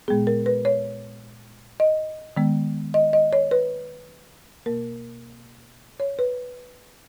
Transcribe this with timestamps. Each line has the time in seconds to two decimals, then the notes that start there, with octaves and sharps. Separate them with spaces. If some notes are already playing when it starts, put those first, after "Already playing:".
0.08 A#2 G#3 B3 G#4
0.27 A#4
0.46 B4
0.65 C#5
1.80 D#5
2.36 D#3 G#3 B3
2.94 D#5
3.13 D#5
3.33 C#5
3.51 B4
4.66 B2 A#3 A#4
6.00 C#5
6.19 B4